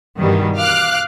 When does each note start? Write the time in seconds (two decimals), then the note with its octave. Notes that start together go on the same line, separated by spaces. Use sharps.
0.19 G2 B2 D#3 E3 G3
0.57 F5 D6 F6 F#6